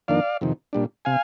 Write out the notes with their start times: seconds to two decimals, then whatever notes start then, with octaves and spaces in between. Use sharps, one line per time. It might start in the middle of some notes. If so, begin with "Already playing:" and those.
0.08 F2 D#3 A#3 D4 D5 F5
0.41 F2 C3 D#3
0.73 A#2 G3 D4
1.05 C3 F5 G#5